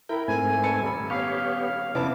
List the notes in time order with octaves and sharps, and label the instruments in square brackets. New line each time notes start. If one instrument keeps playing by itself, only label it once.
[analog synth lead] E4 [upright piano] A#4 [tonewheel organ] G5
[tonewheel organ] G#2 A3 C4 [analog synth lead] G#5
[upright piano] B4 A5 C#7
D#1 B5
[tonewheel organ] B3 G4 C#5 [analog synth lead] F5
[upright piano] F2 B3 A5 [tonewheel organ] C3 C#4 D6 [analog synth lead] E4